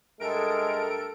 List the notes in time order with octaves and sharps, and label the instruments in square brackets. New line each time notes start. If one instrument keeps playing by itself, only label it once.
[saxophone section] G2 A3 A#4 [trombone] G#3 [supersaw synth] A4 D7